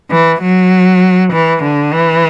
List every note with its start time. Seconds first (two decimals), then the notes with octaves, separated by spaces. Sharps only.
0.11 E3
0.42 F#3
1.33 E3
1.63 D3
1.93 E3